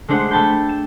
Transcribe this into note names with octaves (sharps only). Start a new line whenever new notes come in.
G#3 A3 D4 C5 F#5
A3 G5 A5 B5 G6
E7